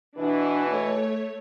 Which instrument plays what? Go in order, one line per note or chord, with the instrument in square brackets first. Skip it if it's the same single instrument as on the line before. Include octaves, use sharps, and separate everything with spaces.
[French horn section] B2 E3 [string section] D4
[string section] A3 C#5